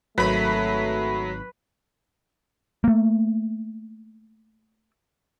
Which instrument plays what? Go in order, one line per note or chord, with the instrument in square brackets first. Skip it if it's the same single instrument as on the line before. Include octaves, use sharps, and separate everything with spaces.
[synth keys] G#1 B5 [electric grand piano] F#3 [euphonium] A3 [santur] B4
[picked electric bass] A3 A#3